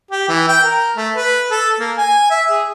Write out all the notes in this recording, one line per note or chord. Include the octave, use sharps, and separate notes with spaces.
G4
E3
G5
A#4
A3
B4
A4
A#3
G#5
E5
G#4